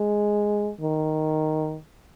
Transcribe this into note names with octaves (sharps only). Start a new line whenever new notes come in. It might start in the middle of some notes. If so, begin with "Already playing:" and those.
Already playing: G#3
D#3